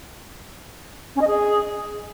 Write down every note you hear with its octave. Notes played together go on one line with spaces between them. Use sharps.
C#4
D#5
G#4